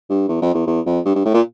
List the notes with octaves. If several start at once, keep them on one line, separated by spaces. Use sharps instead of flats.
G2
E2
F2
E2
E2
F2
G2
G2
A2
A#2